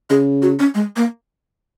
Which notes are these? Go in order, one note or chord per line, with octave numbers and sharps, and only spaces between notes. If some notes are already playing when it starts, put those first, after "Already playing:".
C#3 G#4
F#4
C#4
G#3
A#3